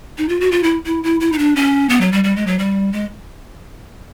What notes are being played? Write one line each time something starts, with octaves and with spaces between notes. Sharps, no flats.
D#4
F4
F#4
F4
E4
E4
E4
E4
D#4
D4
C#4
B3
F#3
G3
G3
G#3
F#3
G3
G#3